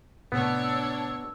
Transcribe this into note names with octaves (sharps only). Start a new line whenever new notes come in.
A2 C3 B3 D4 C#5 A#5 E6